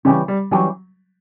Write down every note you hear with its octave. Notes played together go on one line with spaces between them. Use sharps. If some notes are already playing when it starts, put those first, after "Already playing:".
C#3 E3 G3 C#4 G4
G3
E3 F#3 G3 C#4 G4